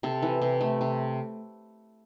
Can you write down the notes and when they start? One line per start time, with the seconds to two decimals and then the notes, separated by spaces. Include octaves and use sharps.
0.03 C3 A4
0.22 E3
0.42 C3
0.61 A3
0.81 C3